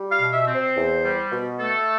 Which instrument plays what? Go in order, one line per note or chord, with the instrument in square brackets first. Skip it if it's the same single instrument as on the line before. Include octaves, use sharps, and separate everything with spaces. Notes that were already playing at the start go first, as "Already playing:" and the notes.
Already playing: [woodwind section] G3
F5
B2
E5
C4
C5
E2
G3
B2
A3 A4